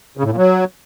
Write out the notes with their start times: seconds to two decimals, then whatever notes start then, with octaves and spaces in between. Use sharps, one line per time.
0.17 C#3
0.24 A2
0.31 A#2
0.37 F#3